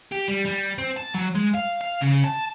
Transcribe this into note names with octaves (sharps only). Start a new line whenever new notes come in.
G4
G3
G3
C4
A5
F#3
G#3
F5
F5
C#3
A5